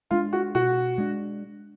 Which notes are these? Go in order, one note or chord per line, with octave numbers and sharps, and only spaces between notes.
G#3 D4 F4
F#4
B2 F#4
G#3 D4